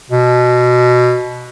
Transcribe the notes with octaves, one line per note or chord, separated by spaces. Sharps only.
B2